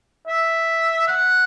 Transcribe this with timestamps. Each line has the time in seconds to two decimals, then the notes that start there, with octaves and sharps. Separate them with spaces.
0.28 E5
1.08 F#5